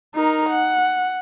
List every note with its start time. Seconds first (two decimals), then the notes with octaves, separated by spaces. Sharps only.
0.14 D#4 A#4
0.49 F#5